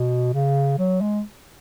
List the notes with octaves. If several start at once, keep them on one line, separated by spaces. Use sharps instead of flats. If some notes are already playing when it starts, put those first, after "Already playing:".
Already playing: B2
C#3
F#3
G#3